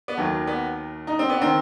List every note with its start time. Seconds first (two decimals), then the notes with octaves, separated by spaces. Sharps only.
0.08 B3
0.17 D#2 D#3 F#3 A3
0.47 B3
1.07 D#4
1.19 C4
1.30 B3
1.41 D#3 C4